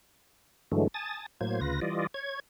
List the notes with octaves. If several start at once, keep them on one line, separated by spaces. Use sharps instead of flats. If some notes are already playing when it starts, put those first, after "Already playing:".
G2 D3 E3 F#3 G#3 A3
G#5 A5 D#6 A6
A2 F#3 A#3 C5 G#6
D2 C#3 F4 B4 A#6
E3 G3 F4 D5 D#5
C#5 G#6